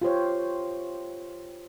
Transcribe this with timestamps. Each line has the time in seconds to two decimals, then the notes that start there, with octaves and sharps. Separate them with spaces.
0.02 F4 G4 C5 C#5